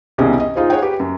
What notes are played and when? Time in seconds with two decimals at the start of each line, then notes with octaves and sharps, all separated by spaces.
0.18 C2 B2 D#3 C#4 G4 G#4
0.40 D#5
0.55 D#4 F4 G#4 C5
0.70 G#4 C#5 F#5 G5
0.82 G4 B4
1.00 F#2